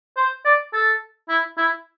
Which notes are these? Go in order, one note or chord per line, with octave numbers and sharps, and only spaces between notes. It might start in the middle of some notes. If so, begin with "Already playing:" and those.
C5
D5
A4
E4
E4